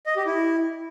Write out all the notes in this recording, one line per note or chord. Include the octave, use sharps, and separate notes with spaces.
D#5
G4
E4